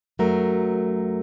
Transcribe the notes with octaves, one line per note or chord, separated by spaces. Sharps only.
F#2 F#3 A3 A#4